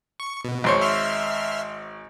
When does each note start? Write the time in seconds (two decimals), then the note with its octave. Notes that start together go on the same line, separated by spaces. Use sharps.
0.20 C#6
0.45 B2
0.64 G#1 C5 C#5
0.81 E5 C6 F6